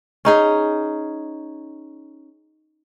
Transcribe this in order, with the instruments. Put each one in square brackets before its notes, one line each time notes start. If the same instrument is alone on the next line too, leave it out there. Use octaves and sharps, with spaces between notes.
[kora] C#4 D#4 G#4